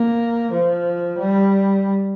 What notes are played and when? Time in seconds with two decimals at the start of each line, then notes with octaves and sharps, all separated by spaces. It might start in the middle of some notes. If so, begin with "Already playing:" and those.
Already playing: A#3
0.52 F3
1.19 G3